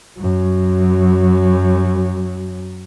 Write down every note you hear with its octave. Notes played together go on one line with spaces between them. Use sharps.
F#2 F#3